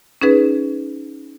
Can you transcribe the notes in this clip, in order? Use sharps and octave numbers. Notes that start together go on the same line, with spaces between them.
C#4 D#4 G#4 B4